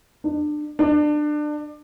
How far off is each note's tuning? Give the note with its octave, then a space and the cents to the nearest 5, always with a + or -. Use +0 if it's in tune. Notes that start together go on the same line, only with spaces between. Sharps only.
D4 +30
D4 +25